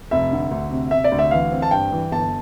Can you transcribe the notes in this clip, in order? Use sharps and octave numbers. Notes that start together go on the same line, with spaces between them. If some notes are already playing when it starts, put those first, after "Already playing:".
F1 E5
D3
D2
C3
C3 E5
D5
D2
E5
E3 F5
C4
A5
G2 G5
E3
G1 A5